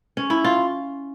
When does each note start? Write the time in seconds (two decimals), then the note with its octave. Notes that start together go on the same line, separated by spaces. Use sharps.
0.17 C#4
0.30 E4
0.44 F4